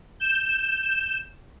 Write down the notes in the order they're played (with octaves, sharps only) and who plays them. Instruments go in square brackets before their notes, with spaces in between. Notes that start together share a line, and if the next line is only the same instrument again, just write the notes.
[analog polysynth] G6 E7